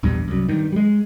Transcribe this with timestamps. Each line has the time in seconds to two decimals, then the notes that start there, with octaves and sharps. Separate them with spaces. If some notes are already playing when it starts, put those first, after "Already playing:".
0.03 A#1 E2 G2
0.28 C2 F#2
0.48 G2 D#3
0.72 G3 G#3